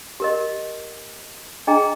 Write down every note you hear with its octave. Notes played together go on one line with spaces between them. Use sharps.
G4 A#4 D#5
D4 G#4 D#5 G5 A#5